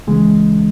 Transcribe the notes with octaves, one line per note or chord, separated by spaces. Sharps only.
C#2 C#3 E3 G#3